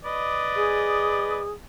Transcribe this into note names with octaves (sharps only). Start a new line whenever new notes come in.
B4 D5 D#5
G#4